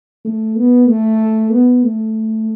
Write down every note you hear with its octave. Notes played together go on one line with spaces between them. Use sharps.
A3
B3
A3
B3
A3